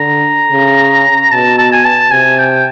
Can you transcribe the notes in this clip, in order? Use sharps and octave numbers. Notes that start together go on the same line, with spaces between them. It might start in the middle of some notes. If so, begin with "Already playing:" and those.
Already playing: D3 A#5
C#3
B2 A5
A5
G#5
A5
C3 G#5
G5